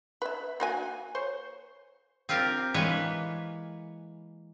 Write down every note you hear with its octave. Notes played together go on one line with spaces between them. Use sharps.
B4 E5
A#3 F#4 G#5
C5 C#5
C4 F4 G4 A#4
E3 G#3 A#3 B4 C#5